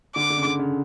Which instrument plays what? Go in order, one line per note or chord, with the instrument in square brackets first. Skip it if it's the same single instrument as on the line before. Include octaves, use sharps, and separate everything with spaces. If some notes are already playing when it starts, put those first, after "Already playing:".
[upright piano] D3 [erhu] D6
[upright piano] D3
C#3
D3
C#3